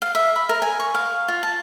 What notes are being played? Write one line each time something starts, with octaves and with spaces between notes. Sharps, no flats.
F5
E5
B5
A#4
G#5
C#6
F5
F4
A5